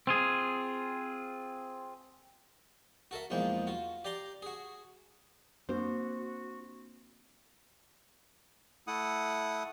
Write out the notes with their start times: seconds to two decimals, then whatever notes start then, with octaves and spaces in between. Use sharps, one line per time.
0.07 C4 F4 G#4
3.11 F#4 A4 A#4 E5
3.30 B1 E2 F3 G#3 A#3 G5
3.67 F4 F#4
4.05 G4 D5 A#5 C6 D6
4.42 F#4 G#4
5.69 A#3 C4 D4 F#4 C5
8.87 A3 E4 F#5 D#6